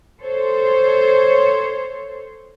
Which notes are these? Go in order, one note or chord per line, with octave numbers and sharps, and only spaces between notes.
A4 C5 C#5